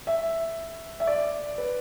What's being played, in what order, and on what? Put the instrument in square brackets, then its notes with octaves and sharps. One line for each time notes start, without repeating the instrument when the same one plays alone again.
[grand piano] E5
E5
D5
B4